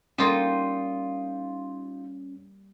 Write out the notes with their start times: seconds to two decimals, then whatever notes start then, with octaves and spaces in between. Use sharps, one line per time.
0.18 G3 A#3 C#4 D#4 F4